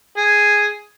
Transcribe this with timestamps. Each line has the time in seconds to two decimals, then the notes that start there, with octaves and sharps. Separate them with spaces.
0.17 G#4